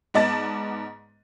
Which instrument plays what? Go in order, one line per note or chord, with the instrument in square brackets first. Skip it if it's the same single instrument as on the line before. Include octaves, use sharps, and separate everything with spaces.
[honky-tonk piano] G#2 B3 D5 D#5 A5 A6